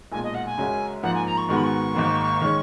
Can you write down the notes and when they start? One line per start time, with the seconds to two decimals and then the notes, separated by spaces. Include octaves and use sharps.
0.12 B1 A#2 G#3 G#5
0.24 D#5
0.34 F#5
0.46 G#5
0.57 F#2 C#3 G#3 C#4 F#4
1.03 G#2 F3 A#3 F#5
1.15 G#5
1.26 A#5
1.37 C#6
1.49 G#2 D#3 G#3 B3 F#4 C#6
1.56 B5
1.63 C#6
1.95 G#1 G#2 D#3 A#3
2.41 D#3 G#3 C#4